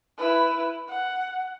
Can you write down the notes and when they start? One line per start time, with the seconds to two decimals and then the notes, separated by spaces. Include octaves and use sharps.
0.18 E4 B4
0.89 F#5